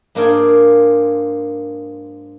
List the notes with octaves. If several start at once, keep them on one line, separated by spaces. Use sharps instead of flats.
G#2 A#3 D4 F4 G#4 G#5